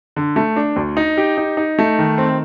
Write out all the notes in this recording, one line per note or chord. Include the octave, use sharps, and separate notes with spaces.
D3
A3
D4
D2
D#4
G4
D#4
D#4
A3
D#3
C4